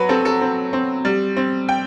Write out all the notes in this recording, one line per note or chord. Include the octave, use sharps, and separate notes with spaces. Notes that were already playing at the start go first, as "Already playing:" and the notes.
Already playing: F#3 B4
C4 A4
A4
C4
C4
G3
C4
G5